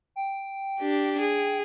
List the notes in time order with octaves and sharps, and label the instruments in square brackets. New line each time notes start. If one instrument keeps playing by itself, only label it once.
[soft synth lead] G5
[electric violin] D4 G4
G#4